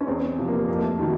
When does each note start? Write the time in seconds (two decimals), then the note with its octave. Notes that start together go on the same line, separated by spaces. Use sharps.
0.01 C#4
0.07 E2 C4
0.38 C3 F3
0.48 A#3
0.68 F2 A#3
0.81 A3
0.99 C3 D#3 F#3